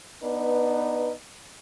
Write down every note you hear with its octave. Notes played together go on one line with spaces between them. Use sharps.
B3 D4 D#4 B4